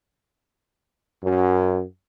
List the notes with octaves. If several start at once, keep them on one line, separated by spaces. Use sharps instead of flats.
F#2